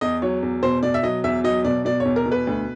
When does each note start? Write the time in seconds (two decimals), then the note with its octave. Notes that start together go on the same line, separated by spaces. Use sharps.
0.01 E2 D#5
0.22 F#3 C#5
0.43 E2
0.63 B2 C5
0.83 B2 D5
0.94 E5
1.03 F#3 D#5
1.24 E2 E5
1.44 F#3 D#5
1.65 B2 D5
1.85 B2 D5
2.00 C#5
2.05 E2
2.16 A#4
2.26 B2
2.32 B4
2.47 D2